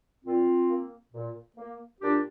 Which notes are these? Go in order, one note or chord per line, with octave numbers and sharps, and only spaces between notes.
A#2 C4 F4
A#3
A#2
A#3
A#2 D4 G4